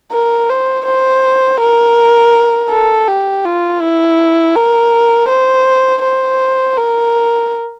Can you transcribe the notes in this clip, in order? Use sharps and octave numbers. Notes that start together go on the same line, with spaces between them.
A#4
C5
C5
A#4
A4
G4
F4
E4
A#4
C5
C5
A#4